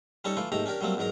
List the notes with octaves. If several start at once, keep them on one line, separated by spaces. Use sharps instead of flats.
G3 C#4 D#4 A4 C#5
E3 A3 F4
D#2 G#2 A3 G4 A#5
C#4 D4 G4 A#4
F#3 G3 A3 A#3 C4
E2 G#2 F#3 A#4 A#5